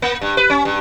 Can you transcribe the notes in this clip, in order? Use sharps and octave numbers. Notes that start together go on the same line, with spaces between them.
A#3
G2
B4
C#4
G2